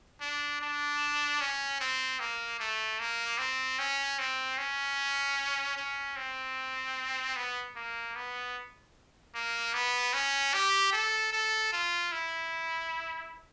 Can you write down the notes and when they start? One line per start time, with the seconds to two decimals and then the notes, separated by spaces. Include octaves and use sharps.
0.21 D4
0.61 D4
1.40 C#4
1.81 C4
2.20 A#3
2.60 A3
3.00 A#3
3.38 C4
3.79 C#4
4.19 C4
4.58 C#4
5.77 C#4
6.16 C4
7.36 B3
7.76 A#3
8.15 B3
9.35 A#3
9.74 B3
10.14 C#4
10.54 G4
10.93 A4
11.33 A4
11.73 F4
12.12 E4